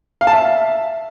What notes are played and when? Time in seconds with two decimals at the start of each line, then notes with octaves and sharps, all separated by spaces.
0.21 F5
0.27 A5
0.33 E5